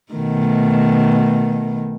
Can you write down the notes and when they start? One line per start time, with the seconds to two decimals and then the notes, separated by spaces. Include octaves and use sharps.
0.12 B2 D#3 A3